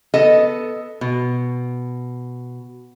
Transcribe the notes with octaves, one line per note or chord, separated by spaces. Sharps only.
B3 A4 D#5
B2